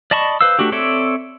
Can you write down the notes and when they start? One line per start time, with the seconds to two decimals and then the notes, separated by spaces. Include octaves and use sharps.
0.11 D5 D#5 A5 B5 C#6
0.41 B4 C5 F5 E6
0.59 A3 D4 F#4 G4
0.72 C4 A4 C#5 D5 E5